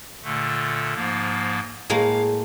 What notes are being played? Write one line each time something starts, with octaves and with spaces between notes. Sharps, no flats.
A#2 D3 A3
G#2 F3 A#3
A2 G#3 A#3 F5